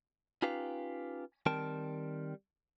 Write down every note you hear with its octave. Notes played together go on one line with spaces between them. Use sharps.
C#4 D#4 F4 G4 B4 F5
D#3 G3 C4 A#4 G5 A5